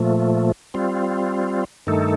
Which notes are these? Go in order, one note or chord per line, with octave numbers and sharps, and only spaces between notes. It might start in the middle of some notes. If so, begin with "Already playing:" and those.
Already playing: A#2 F3 A3
G3 C4 F4
G2 D#3 A3 D#4 A4